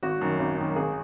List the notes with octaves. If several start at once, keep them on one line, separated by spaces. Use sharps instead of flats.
G#1 F#4
F#2 D#3
G#1
F#2 D#3
G#1 G#4